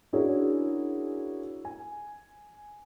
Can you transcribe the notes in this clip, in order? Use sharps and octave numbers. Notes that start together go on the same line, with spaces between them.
C#4 D4 E4 F#4 G#4 A#4
G#5